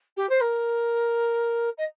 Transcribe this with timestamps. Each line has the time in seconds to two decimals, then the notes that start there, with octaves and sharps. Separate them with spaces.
0.16 G4
0.29 C5
0.41 A#4
1.77 D#5